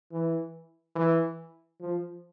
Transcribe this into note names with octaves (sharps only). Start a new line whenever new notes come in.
E3
E3
F3